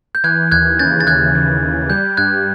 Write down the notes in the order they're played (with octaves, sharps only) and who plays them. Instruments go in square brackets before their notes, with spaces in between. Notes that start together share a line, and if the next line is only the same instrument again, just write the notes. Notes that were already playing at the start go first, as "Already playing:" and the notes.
[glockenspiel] G6
[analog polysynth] E3 [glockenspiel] F#6 G#6
[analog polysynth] D#2 [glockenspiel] F#6 G#6
[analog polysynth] C#3 [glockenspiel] G6 A6
[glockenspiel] A6
[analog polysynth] D#2 [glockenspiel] F#6 G#6
[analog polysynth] E3
D#2
[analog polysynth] G3 [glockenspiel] G6
[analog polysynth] G2 [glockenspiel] F#6 G#6